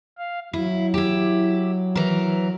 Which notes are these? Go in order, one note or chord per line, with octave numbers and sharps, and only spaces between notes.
F5
F#3 E4
E4 G4
E3 A#4